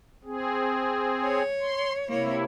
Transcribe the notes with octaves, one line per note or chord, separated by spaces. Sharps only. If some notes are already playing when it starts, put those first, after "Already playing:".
C4 G#4
C#5
C6
C3 A#3 E4 C#5